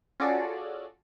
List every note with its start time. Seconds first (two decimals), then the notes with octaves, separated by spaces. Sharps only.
0.20 C#4 F4 F#4 G#4 A4 D5